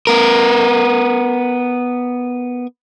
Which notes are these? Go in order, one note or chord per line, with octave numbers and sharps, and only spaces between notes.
B3 A#4